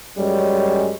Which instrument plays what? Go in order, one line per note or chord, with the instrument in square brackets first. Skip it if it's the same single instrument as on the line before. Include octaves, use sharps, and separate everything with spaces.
[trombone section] F#2 G3 G#3 C#4